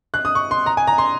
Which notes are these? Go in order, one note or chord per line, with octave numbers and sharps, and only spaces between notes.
F#6
D#6
C#6
C6
A#5
G#5
A#5
C6